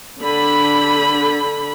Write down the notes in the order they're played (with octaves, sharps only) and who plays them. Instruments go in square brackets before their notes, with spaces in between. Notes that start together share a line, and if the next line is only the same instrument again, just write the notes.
[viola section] D3 B5